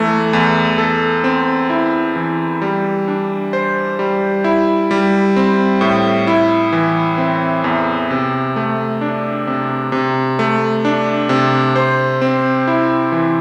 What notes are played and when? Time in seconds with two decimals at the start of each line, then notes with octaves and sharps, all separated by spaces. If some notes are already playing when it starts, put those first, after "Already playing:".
Already playing: E2 E3 A3
0.33 E2
0.78 A4
1.24 C4
1.70 E4
2.16 E3
2.62 G3
3.08 D4
3.53 C5
3.99 G3
4.44 E4
4.91 G3
5.36 C4
5.81 A2
6.27 E4
6.72 E3
7.18 C4
7.64 E2
8.11 C3
8.56 A3
9.01 D4
9.47 C3
9.92 C3
10.39 A3
10.85 D4
11.29 C3
11.76 C5
12.22 C4
12.67 E4
13.12 E3